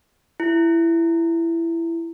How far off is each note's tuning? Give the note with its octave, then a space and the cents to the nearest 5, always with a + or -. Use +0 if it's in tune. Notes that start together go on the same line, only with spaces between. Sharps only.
E4 +15